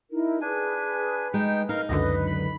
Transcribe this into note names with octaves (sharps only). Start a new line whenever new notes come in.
D#4 E4 A#4
D4 G#4 B4 G#5
G#3 D#4 G5
D#4 A#4 F5
C#2 F#2 D3 B4 D#5
B5